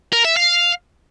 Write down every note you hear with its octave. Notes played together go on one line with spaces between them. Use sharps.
A#4
E5
F5